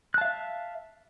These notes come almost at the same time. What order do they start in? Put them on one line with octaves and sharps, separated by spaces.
F#6 A5 F5 E5